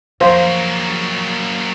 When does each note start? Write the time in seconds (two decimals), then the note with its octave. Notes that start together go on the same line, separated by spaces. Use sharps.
0.21 F2 C#3 F#3 A#3 C5 F5